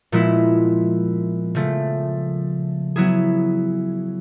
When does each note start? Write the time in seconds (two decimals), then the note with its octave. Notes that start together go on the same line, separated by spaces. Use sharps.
0.12 A#2 F3 G#3 B3 E4
1.55 C#3 F3 A3
2.96 F#3 B3 E4 G#4